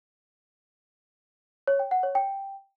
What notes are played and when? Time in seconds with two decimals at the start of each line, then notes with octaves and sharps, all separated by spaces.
1.68 C#5
1.79 G5
1.91 F#5
2.03 C#5
2.15 G5